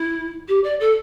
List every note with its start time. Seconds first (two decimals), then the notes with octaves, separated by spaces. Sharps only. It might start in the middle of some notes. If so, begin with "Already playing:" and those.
Already playing: E4
0.48 G4
0.64 D5
0.80 A4